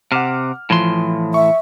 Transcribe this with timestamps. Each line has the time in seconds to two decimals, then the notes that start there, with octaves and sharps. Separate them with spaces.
0.12 C3 F#5 D6 F6
0.70 A2 E3 F3 C6
1.34 E5 C#6